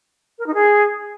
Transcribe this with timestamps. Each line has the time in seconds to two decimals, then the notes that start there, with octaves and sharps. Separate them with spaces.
0.39 A#4
0.47 D#4
0.54 G#4